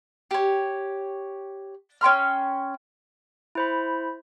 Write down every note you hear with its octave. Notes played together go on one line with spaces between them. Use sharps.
G4 C#5
C#4 G5 C6 F6
E4 C5 B5